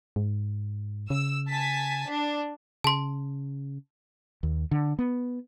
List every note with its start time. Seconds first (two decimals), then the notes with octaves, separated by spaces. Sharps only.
0.16 G#2
1.10 C#3 E6
1.49 G#5 A5 B6
2.09 D4
2.84 C#3 A5 C6
4.43 D#2
4.71 D3
4.99 B3